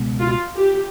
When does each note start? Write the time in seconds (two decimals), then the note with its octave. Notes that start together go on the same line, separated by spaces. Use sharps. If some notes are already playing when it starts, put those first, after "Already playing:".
Already playing: C#2 B2 G#3 B3
0.20 F4
0.56 G4